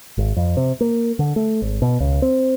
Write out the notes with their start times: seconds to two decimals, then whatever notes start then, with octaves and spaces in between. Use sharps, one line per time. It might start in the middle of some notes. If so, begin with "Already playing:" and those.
0.18 G#1
0.37 F2
0.57 C3
0.81 A#3
1.19 D3
1.36 A3
1.62 G#1
1.82 B2
2.00 C#2
2.22 C4